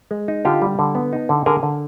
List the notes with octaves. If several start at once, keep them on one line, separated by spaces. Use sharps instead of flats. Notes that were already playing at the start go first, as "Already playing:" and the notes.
G#3
D#4
D3 F4 G4
G3
D3
B3
D#4
D3
D3 G#4 A#4
D3